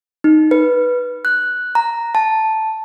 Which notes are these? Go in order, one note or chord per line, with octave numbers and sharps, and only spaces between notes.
D#4
B4
F#6
A#5
A5